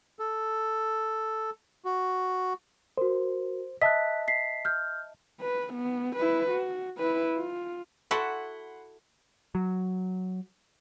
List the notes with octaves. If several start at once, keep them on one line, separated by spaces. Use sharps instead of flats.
A4
F#4
F#4 A#4 C5
D#5 E5 A5 F#6 B6
B6 C7
F6 G6
B4
B3
E4 B4
F#4
E4 B4
F4
E4 F#4 A4 F#5 B5 C6
F#3